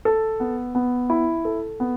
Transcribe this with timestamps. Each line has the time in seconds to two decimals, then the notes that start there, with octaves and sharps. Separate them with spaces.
0.05 A4
0.40 B3
0.75 B3
1.10 E4
1.45 A4
1.80 B3